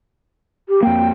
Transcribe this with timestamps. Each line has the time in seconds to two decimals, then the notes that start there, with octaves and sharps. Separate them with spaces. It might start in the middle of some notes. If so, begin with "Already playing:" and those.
0.68 G4
0.83 F2 A#3 G5